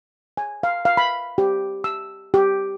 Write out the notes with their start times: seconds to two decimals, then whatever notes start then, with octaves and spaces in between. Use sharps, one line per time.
0.37 G#5
0.63 F5
0.85 F5
0.97 B5
1.38 G4
1.84 E6
2.34 G4